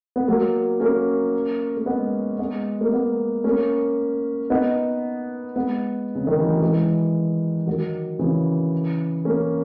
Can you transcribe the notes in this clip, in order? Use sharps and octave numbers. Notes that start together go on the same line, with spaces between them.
B3
F#3 A#3
A#3 C#4
A#3
G#3 B3
G#3 B3
A#3
G#3 B3
A#3 C#4
B3 D#4
G#3 B3
C#3
D#3
E3
F#3
E3 G#3
D#3 F#3
C#3 E3
A#3 C#4